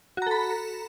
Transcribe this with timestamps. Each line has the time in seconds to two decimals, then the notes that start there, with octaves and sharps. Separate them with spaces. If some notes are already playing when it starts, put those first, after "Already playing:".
0.17 F#4
0.22 A#5
0.27 A4
0.31 B5